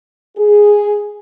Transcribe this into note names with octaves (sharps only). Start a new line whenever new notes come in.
G#4